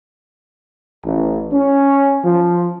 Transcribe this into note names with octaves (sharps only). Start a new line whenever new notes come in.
A1
C#4
F3